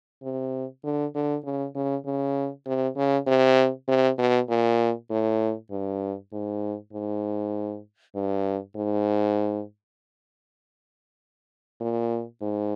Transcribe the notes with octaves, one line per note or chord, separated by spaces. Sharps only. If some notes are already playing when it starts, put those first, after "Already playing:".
C3
D3
D3
C#3
C#3
C#3
C3
C#3
C3
C3
B2
A#2
A2
G2
G#2
G#2
G2
G#2
A#2
G#2